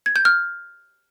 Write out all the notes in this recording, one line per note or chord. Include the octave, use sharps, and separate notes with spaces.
G#6
G6
F6